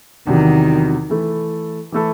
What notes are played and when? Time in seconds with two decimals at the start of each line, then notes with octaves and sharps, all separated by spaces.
0.27 E2 C3 D#3 F#3
1.10 E3 A3 E4 A4
1.92 E3 A3 E4 A4